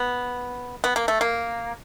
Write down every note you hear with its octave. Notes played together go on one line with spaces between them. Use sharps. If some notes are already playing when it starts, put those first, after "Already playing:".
Already playing: B3
B3
A#3
A3
A#3